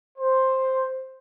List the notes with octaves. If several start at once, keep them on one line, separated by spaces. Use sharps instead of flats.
C5